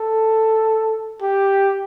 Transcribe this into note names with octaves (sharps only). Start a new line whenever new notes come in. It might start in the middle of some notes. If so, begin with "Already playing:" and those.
Already playing: A4
G4